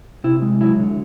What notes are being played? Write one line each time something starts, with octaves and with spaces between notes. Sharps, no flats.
C3 E4
G#3
F#3 E4
D3